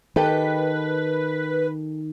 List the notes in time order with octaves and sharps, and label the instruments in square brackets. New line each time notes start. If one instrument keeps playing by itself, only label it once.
[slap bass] D#3 [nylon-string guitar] G4 A4 G5 [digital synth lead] B4